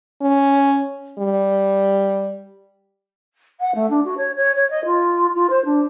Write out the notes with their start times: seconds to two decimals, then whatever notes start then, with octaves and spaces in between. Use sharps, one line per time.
0.21 C#4
1.19 G3
3.59 F#5
3.74 A3
3.90 D4
4.04 F#4
4.17 C#5
4.36 C#5
4.55 C#5
4.70 D#5
4.85 F4
5.35 F4
5.49 C5
5.65 D4